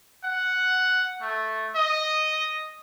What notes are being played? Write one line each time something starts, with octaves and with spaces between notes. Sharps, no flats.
F#5
A3
D#5